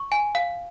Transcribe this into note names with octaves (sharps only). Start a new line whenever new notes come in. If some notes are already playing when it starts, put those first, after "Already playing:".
Already playing: C#6
G#5
F5